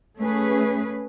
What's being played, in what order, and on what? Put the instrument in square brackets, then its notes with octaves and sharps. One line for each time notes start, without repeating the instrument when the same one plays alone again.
[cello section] A3 C#4 G#4 B4